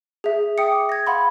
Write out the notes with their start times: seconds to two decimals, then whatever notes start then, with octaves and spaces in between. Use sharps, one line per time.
0.24 G#4 E5
0.58 E5 G5 D#6 C#7
0.72 D6
0.89 G#6 A#6
1.07 F5 F#5 B5 C6